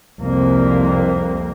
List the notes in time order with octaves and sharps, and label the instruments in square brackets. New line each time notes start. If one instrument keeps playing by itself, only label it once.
[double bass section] C2 F2 A#3